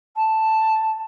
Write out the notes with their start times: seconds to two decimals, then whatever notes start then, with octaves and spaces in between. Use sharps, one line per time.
0.16 A5